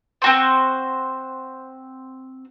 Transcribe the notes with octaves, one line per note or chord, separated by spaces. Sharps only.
C4 F#4 C5